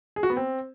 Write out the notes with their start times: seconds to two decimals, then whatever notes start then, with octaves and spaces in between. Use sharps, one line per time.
0.16 G#4
0.23 F#4
0.30 B3
0.37 C4